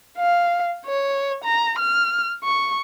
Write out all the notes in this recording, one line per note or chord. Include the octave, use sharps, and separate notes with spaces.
F5
C#5
A#5
F6
C#6